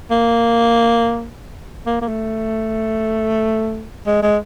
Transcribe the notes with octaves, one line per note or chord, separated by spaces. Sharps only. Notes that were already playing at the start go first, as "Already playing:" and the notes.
A#3
A#3
A#3
A3
G#3
G#3